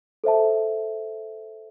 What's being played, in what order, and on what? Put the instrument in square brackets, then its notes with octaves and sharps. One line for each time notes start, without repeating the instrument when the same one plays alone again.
[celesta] A4 C5 E5 A5